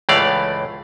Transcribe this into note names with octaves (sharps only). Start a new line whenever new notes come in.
C#2 A2 E3 A3 D5 F5